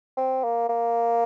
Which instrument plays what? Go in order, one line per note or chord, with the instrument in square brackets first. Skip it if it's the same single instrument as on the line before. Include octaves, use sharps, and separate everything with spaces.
[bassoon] C4
A#3
A#3